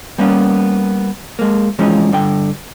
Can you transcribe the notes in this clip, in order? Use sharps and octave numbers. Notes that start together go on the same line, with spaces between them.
G3 A#3 B3 C#4
G#3 A#3
E3 F3 G#3 C#4 D#4
G2 D3 G5